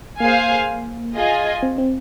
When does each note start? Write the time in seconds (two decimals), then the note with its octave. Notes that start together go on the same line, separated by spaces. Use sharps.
0.20 A#3 G#4 C5 F5 G#5
1.15 F4 G#4 D#5 G#5
1.63 C4
1.78 C4